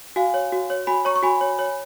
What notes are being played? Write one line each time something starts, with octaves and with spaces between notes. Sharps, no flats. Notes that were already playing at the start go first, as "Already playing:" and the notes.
F#4 F5 G#5
C#5
F#4
C#5
F#4 G#5 B5
C#5 A#5 C#6
C#6
F#4 G#5 B5
C#5
C#5